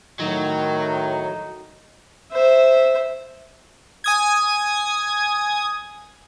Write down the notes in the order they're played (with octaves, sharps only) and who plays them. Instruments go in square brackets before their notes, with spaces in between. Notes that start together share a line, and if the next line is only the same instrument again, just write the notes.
[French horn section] A2 D#3 [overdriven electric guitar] F#3 [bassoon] D#4
[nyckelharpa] C5 E5
[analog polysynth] G#5 D#6 G#6